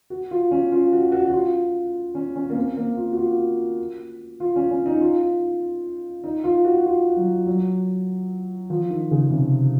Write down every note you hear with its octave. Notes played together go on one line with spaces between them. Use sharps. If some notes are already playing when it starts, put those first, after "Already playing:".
F#4
F4
C#4
F4
F#4
F#4
F#4
F4
C#4
C#4
A#3
C4
A#3
F4
F#4
F4
F4
C#4
C#4
D#4
F4
D#4
F4
F#4
F4
F#3
F#3
F3
D#3
C#3
C3